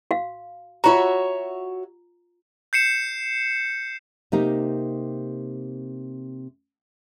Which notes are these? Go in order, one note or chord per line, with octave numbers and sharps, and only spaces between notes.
F#4 F5
F4 F#4 C#5 E5 A#5
G6 C7 C#7 E7
C3 A#3 D#4 G4